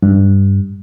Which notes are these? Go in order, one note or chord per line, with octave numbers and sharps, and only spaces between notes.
G2